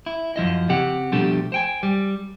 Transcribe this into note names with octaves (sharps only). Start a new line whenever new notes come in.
E4
F#2 F3 E4 D#5
C#3 C4 G4 F#5
B2 F3 G3 A3 D4 G4
C5 G5 G#5
G3